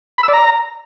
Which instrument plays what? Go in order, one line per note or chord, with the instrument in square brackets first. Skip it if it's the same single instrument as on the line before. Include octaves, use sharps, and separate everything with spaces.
[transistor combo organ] B5
E6
D5
A#5